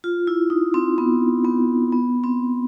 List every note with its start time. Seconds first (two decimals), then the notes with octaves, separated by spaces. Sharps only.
0.04 F4
0.27 E4
0.50 D#4
0.74 C4
0.98 B3
1.44 B3
1.92 B3
2.23 C4